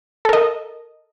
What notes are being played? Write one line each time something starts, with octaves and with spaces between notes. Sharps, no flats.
A4 A#4 D#5